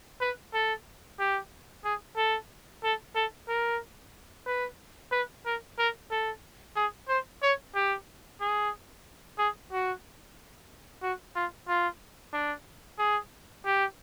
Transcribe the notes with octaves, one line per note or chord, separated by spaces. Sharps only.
B4
A4
G4
G#4
A4
A4
A4
A#4
B4
B4
A#4
A#4
A4
G#4
C5
C#5
G4
G#4
G#4
F#4
F#4
F4
F4
D4
G#4
G4